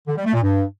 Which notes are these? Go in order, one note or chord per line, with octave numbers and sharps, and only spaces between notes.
D3
G3
A3
A#2
G2